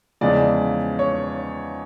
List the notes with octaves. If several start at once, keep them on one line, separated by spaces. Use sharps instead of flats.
E2 C#3 F3 G#3 D5
C#5